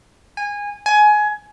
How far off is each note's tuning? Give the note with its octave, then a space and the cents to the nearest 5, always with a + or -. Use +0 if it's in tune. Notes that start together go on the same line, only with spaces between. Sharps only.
G#5 -20
G#5 +20